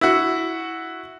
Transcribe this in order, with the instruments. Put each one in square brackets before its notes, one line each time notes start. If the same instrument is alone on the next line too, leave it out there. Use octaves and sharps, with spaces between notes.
[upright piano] E4 F#4